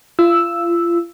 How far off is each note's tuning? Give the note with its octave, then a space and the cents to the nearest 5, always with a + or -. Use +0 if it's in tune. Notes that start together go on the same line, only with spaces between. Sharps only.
F4 -30 E6 +0